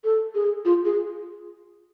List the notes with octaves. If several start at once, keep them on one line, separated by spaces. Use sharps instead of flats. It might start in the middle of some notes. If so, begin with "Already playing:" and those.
A4
G#4
F4
G#4